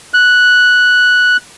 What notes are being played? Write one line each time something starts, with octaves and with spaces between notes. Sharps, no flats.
F#6